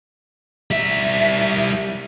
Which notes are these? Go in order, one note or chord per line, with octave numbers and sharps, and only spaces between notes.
G3 E5